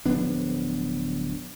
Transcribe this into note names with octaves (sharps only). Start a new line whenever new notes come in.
D1 F3 B3 D4